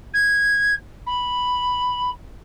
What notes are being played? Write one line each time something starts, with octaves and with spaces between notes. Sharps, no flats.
G#6
B5